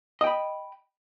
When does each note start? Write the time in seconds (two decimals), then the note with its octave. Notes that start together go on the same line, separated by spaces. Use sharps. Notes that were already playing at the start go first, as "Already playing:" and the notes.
0.21 D#5
0.24 G5
0.27 B5